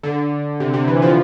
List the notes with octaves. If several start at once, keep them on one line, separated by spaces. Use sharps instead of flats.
D3
C3
C3
E3
F3